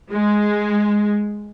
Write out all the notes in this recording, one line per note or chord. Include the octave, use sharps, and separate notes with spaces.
G#3